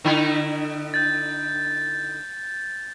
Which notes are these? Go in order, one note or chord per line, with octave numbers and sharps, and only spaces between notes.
D3 D#4 E4
G6 A6